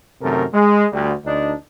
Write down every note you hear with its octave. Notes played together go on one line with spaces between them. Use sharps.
F#2 C3 D#3 A3 A4 A#4
G#3
D2 G3
D2 D4 D#4